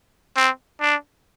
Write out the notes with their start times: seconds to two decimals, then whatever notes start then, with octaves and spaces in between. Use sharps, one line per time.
0.36 C4
0.81 D4